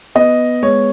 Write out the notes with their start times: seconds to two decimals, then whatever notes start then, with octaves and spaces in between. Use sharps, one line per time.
0.15 B3 D#5
0.62 G#3 C#5